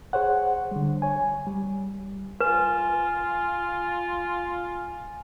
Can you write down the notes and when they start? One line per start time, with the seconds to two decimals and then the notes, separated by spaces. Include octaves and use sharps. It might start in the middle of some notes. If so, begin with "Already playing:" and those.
0.13 G#4 C5 C#5 F#5
0.71 D3 G3
1.02 C#5 G#5
1.47 G3
2.40 F4 B4 G#5